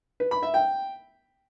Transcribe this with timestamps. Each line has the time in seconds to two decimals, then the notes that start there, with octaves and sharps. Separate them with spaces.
0.20 B4
0.31 B5
0.43 E5
0.54 G5